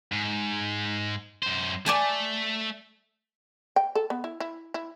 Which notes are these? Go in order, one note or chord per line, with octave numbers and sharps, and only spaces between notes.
G#2
F#2 C5
A3 D5 G#5 A5
G5
A4
B3
E4
E4
E4